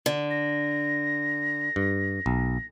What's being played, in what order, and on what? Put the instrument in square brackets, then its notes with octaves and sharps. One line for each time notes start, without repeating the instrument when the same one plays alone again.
[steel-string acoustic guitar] D3
[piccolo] A#6
[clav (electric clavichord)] G2
B1